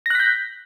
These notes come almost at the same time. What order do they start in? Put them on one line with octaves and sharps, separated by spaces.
A#6 F#6 B6 G6